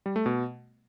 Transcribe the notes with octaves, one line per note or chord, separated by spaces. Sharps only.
G3
A3
B2